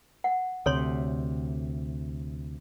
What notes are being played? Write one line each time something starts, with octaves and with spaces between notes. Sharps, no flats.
F#5
D2 C3 A4 C#5 C6